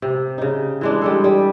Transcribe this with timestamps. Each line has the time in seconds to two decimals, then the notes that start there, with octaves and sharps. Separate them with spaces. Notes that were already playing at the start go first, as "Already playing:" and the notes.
0.02 C3
0.38 C#3 D#4
0.81 E3 G#3 D4
1.01 G3 G#3 A4
1.24 G3